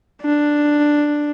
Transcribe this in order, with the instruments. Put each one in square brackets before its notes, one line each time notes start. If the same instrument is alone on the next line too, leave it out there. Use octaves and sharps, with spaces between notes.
[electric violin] D4